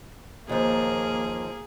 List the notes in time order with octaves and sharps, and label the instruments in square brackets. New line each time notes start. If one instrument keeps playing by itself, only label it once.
[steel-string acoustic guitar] D#2 F3 [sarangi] A#3 [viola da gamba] G#4